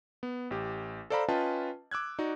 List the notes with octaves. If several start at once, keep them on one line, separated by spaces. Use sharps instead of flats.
B3
A1 G4
A4 C5 D5 F5 A#5 B5
C#4 F4 B4 D#5 G5 A5
D6 E6 F#6 G#6
D#4 F#4 D5